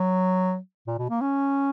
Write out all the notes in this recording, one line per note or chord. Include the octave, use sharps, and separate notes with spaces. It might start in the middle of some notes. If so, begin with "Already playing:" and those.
Already playing: F#3
A#2
B2
A#3
C#4